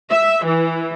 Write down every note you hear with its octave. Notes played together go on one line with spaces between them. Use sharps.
E5
E3